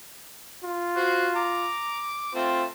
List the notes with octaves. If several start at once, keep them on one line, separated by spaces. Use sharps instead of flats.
F4
F#4 C5
A#5 D6
A3 C4 F4